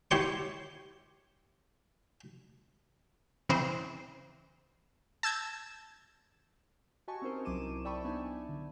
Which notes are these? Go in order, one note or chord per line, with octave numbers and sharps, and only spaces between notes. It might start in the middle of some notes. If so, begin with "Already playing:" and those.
E4 G4 C#5 C6
C#3 E3 C4 C5
A5 E6 G6 G#6
F#4 G4 D#5 G#5 A5 C#6
C4 C#4 D#4 A#4 C5 D#5
C2 F#3 E4 D6 D#7 E7
D5 E5 G5 A5 B5 C#6
B3 D4 D#4 E5 G#5 A5
D3